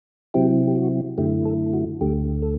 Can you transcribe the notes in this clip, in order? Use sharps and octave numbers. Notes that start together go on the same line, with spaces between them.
C3 F#3 C4 E4 G4
G4
F#4
F#2 D3 A3 E4 G4
A4
F#4
D2 D3 A3 G4
A4